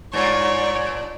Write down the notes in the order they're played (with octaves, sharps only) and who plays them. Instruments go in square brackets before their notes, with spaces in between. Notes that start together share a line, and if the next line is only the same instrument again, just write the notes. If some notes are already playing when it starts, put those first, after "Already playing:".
[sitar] G2 F4 [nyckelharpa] C#5 [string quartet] D5